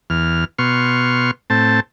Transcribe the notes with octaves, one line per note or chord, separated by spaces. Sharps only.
E2 F6
B2 C6 C#6 F6
A2 C4 A5